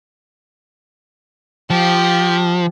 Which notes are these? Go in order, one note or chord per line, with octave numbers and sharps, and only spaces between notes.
F3 G4